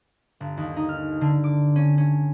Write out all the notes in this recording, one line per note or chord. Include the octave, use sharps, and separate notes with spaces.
G1
D#2
D#4
F6
D3
D6
C#4
C#4